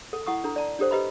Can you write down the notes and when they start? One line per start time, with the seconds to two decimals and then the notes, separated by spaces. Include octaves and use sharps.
0.13 A4
0.26 E4 F#5 C#6 D#6
0.44 D4 A4 A#5
0.56 D5 A5 A#5
0.79 D4 G4 A4 C5
0.91 G4 B4 D#5 A#5 B5